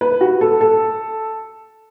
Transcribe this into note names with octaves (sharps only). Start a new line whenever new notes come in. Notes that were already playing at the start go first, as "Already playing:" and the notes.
B4
F#4
A4
A4